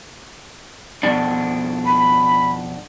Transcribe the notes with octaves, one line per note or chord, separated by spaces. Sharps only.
F2 B2 D4
B5